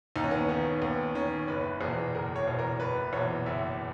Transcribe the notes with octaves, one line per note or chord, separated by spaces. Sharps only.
D#2 D#4
C#4
B3
C#4
D#3 B3
D#2 B3
D#3 C#4
F#1 B4
E2 B2 G#4
F#1 A#4
C#5
E2 B2
A#4
F#1 B4
E2 B2 C#5
F#1 E5